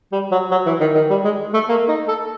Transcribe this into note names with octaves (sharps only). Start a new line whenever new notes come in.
G3
F#3
F#3
E3
D#3
D#3
G3
G#3
A3
A#3
D#4
A4